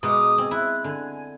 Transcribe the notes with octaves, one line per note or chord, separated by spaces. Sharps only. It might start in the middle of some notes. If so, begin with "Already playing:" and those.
B2 G#3 A#5 D6 D#6
C4 G#5
E4 F#6
D3 G#5